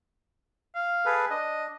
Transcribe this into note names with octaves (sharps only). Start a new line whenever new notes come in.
F5
G#4 A4 B4
D4 D#5